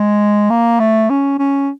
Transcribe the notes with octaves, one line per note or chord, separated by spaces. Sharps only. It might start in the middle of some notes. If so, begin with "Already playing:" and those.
Already playing: G#3
A#3
A3
C#4
C#4